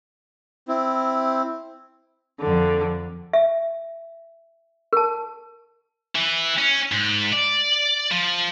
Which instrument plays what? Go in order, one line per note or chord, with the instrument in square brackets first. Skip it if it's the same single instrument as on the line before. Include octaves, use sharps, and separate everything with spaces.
[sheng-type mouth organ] C4 E4
[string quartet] F2 D3
[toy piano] E5
A#4 A5
[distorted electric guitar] E3
C#4
G#2
D5
F3